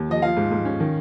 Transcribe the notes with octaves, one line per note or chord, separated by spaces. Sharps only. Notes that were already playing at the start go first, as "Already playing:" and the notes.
Already playing: D#2
F3 D#5
F3 F5
G#2
G#2
C#4
D#3